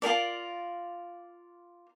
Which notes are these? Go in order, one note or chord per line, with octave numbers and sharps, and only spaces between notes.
F4 G#4 A#4 D5